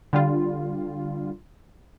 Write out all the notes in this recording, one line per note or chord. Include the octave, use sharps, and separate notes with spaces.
D3 G3 F4